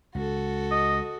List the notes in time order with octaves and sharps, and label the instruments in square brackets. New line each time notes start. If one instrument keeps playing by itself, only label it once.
[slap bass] C#2 [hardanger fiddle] F#4 A4
[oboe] D#5